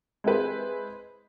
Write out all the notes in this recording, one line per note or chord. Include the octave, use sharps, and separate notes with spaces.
G#3 C4 E4 G#4 B4 C5